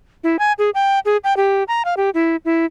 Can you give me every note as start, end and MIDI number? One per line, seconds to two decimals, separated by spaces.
0.24 0.37 64
0.39 0.52 80
0.59 0.70 68
0.74 0.99 79
1.05 1.17 68
1.24 1.36 79
1.37 1.63 67
1.68 1.82 82
1.85 1.94 77
1.97 2.10 67
2.14 2.36 64
2.45 2.66 64